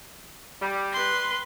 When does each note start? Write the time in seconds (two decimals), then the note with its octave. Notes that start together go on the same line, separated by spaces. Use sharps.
0.61 G3
0.92 B4 C6